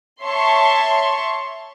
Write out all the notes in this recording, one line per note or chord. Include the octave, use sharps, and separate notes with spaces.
C#5 E5 A5 C6 C#6